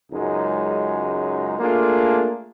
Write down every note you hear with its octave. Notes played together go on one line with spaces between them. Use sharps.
C#2 F#2 G#3 D#4
A3 A#3 D4 F4 G#4